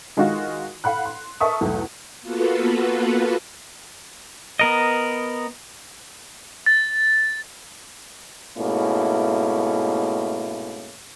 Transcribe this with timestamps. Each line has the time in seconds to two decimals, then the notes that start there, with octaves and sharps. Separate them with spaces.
0.17 D#3 G#3 D#4 F4 F#4
0.84 F5 F#5 B5 F#6
1.05 C6
1.40 A#4 D#5 E5 A5 C#6 D#6
1.61 B1 E2 A3
2.21 A#3 B3 F4 F#4 A4 B4
4.59 B3 A#4 D#5
6.66 A6
8.57 G#2 B2 A3 A#3 C#4 E4